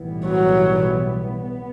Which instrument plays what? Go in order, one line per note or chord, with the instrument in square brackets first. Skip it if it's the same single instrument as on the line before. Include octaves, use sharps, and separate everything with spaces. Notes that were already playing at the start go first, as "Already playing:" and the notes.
Already playing: [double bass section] B1 A2 E3 G3 B3
[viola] F#3
[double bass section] B3